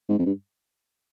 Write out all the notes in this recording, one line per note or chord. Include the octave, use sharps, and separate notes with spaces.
G#2
F2
G2